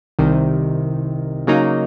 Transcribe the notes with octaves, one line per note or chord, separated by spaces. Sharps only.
C2 C3 D#3
C#3 F#3 A#3 D#4